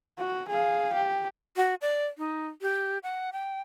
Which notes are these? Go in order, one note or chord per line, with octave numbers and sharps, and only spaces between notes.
F#4
G#4 F5
G4
F#4
D5
D#4
G4
F#5
G5